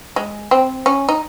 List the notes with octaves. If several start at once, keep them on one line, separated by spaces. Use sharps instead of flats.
G#3
C4
C#4
D#4